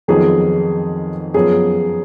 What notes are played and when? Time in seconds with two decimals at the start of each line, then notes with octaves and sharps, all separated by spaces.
0.08 F2 D#3 F#3 B3 D#4 G#4
1.34 F#2 F3 B3 G#4